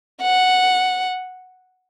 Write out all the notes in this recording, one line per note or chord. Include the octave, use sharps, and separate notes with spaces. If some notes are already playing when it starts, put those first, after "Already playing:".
F#5